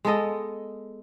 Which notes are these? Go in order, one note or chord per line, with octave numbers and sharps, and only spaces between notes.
G#3 B3 A4 D#5